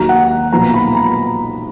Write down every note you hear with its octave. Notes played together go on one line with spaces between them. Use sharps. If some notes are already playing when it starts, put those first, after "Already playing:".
Already playing: D#2 D#3 F#3 A#5
F#5
B1 A#2 F3 B3 A#5
B5
A#5